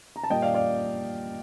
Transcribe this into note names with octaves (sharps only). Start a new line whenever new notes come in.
A#5
A5
A#2 G3 A#3 D#5 G5
D5 F5
D5 F5